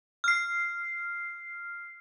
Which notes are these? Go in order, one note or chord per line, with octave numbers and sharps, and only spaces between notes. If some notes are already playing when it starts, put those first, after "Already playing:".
F6 C7